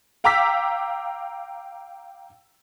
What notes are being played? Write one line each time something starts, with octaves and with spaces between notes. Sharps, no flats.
F5 G5 A#5 D6 E6 B6